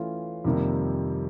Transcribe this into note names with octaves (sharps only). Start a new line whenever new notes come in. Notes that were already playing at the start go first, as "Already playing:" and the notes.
Already playing: E3 A3 C#4 F4
F2 C3 D#3 G3 A#3